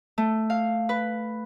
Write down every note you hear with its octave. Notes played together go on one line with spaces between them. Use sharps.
A3
F5
B4